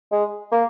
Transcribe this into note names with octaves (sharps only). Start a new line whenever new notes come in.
G#3
A#3